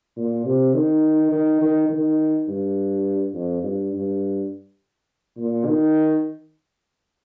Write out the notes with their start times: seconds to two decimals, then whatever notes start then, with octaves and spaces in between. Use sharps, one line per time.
0.17 A#2
0.45 C3
0.74 D#3
1.32 D#3
1.61 D#3
1.90 D#3
2.48 G2
3.34 F2
3.63 G2
3.93 G2
5.37 A#2
5.66 D#3